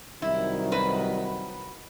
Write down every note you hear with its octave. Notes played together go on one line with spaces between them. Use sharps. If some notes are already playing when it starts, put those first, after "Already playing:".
C2 D#3 F#3 E4
F#4 B4